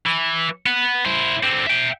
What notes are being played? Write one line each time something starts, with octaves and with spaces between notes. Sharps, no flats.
E3
B3
E4 C5
D3 C4
E5 G5